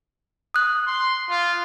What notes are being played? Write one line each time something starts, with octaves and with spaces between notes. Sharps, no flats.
D#6 F#6
C6
F4